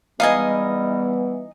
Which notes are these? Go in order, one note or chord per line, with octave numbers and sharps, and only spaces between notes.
E3 G3 G#3 B3 D#4 D#5 F5 G#5